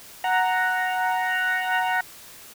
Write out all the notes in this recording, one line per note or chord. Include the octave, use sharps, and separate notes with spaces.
F#5 A#5